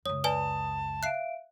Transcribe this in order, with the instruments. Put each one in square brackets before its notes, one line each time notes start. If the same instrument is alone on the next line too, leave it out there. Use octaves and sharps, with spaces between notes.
[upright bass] C#2 F#2 [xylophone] C#5 [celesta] D#6
[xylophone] B4 D5 G#5 [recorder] A5
[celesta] E5 F5 D7 [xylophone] F#6 C7